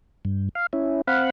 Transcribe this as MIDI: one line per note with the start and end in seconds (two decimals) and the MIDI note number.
0.25 0.49 43
0.55 0.66 77
0.73 1.01 61
0.73 1.01 64
1.07 1.30 60
1.07 1.30 77
1.07 1.30 78
1.07 1.30 83